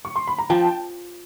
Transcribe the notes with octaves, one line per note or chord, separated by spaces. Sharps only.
C#6
C6
B5
A#5
F3 G5 A5